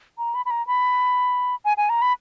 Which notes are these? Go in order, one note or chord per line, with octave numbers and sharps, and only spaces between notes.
A#5
B5
B5
A#5
B5
G#5
G#5
A#5
B5